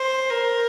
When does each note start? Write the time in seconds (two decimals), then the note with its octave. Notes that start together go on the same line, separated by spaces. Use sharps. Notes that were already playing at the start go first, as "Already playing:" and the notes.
Already playing: C5
0.30 A#4